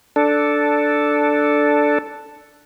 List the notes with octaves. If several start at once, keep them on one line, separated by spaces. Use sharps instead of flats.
D4 A4